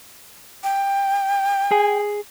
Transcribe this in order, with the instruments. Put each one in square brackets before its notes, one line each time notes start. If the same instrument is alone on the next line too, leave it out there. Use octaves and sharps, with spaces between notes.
[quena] G5
[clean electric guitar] G#4 G#5